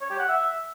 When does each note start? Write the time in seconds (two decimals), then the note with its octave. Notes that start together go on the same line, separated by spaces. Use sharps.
0.01 C#5
0.10 G4
0.19 F#5
0.28 E5